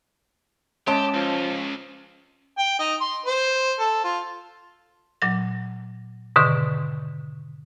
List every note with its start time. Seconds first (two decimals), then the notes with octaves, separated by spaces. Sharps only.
0.87 G#3 C#4 G4 A5
1.14 C#2 F3
2.58 G5
2.79 D#4
3.01 C6
3.26 C5
3.79 A4
4.04 F4
5.22 A#2 F#3 A#6
6.36 G#2 B2 D3 D#3 C#6